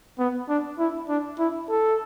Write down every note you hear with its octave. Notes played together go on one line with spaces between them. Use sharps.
B3
D4
E4
D4
E4
A4